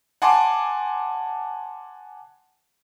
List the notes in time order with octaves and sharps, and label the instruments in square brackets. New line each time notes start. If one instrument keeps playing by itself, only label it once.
[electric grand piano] F#5 G#5 A5 C6 D6